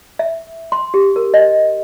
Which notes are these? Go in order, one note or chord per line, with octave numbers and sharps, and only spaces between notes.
E5
C6
G4
A#4
D#5